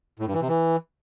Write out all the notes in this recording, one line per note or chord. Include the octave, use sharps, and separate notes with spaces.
A2
G2
E3
C3
E3